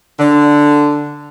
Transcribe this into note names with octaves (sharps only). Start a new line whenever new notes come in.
D3